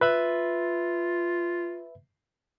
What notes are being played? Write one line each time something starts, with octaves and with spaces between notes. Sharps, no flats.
F4 B4 E5 B5